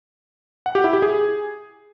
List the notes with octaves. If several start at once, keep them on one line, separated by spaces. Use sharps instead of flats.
F#5
G4
E4
G4
G#4